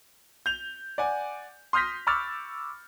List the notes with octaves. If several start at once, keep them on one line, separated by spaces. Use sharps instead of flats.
G6 F7
D5 F#5 G#5
C6 D#6 F6 G6 A#6 B6
B5 C#6 D6 E6 F6 A6